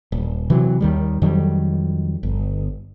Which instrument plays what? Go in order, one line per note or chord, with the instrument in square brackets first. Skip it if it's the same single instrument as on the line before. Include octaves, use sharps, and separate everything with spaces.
[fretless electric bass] D#1
C3 E3 F#3
D#2 D#3 G3
F2 D#3 F#3 G3
G1